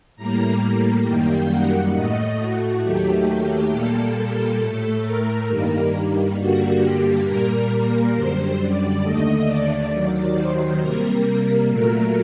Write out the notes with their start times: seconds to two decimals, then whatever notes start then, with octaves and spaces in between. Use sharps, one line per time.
0.16 A2 G3 A#3 A#5
0.61 A#5
1.05 F#2 D#3 G3 A#3 G5
1.49 F#5
1.93 A2 A3 D#5
2.38 F#4
2.82 D#2 D#3 F#3 A3 G4
3.70 A#2 G3 A#3 A4
4.60 A2 A3
5.04 A#4
5.48 G2 D#3 G3 A#3 A#4
6.36 G2 D3 G3 A#3 F#4
6.80 G4
7.25 A#2 G3 A#3 A#4
8.14 F#2 D3 G3 C5
8.58 D5
9.02 D#2 D3 A3 D#5
9.47 D5
9.91 D#2 D#3 F#3
10.35 C5
10.79 C3 G3 A#3 A#4
11.68 A#2 F#3 A3 A#4